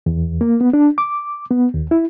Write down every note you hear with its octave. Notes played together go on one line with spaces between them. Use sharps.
E2
A#3
B3
D4
D6
B3
D#2
E4